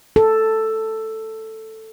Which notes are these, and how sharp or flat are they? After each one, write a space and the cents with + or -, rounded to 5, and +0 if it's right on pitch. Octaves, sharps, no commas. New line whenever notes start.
A4 +5